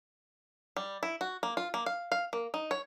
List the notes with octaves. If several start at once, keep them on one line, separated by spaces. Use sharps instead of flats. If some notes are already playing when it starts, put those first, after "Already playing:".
G3
E4
F#4
A#3
F4
A#3
F5
F5
A#3
D#4
C#5